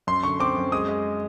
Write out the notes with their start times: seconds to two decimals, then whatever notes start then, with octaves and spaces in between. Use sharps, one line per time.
0.07 F#2 C6
0.23 D3 C#6
0.40 C4 D6
0.56 F#2
0.72 G#3 D#6
0.88 G#3